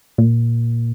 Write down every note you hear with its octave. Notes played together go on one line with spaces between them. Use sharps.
A#2